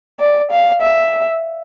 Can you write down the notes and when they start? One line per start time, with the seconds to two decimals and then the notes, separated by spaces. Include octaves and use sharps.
0.20 D5
0.51 F5
0.82 E5